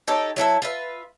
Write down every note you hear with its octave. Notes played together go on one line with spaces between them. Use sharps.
D#4 G4 A4 C#5
F#3 E4 A4 E5
F4 B4 E5